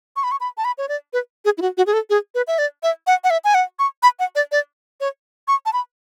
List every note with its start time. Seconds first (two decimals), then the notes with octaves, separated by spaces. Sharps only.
0.16 C#6
0.24 B5
0.32 C#6
0.41 B5
0.57 A5
0.65 B5
0.78 C#5
0.89 D5
1.13 B4
1.45 G#4
1.58 E4
1.62 F#4
1.77 F#4
1.87 G#4
1.93 A4
2.10 G#4
2.35 B4
2.47 E5
2.59 D5
2.83 E5
3.07 F#5
3.24 F#5
3.30 E5
3.44 G#5
3.54 F#5
3.79 C#6
4.03 B5
4.19 F#5
4.35 D5
4.52 D5
5.00 C#5
5.48 C#6
5.66 A5
5.73 B5